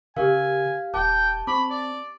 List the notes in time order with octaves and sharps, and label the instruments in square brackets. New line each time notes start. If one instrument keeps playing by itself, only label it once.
[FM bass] C#3 [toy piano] G4 A#4 [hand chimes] F5 [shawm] G#5
[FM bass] D#1 [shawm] G5 [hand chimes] A5 [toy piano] D6
[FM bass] C4 [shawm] B5 [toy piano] C#6 D6
[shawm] D5